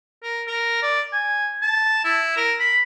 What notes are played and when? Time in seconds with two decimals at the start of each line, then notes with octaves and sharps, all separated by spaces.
0.23 A#4
0.47 A#4
0.82 D5
1.13 G#5
1.62 A5
2.05 E4
2.37 A#4
2.60 B5